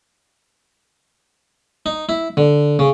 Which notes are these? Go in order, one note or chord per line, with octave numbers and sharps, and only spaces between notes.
D#4
E4
D3
C#3